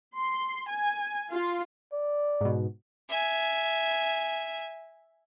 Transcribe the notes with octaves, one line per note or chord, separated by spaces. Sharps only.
C6
G#5
F4
D5
G#2 B2
E5 G#5